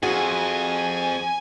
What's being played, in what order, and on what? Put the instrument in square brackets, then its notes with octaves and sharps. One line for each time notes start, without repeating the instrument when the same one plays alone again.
[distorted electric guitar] F2 [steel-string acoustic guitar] F#4 G#4 [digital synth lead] G#5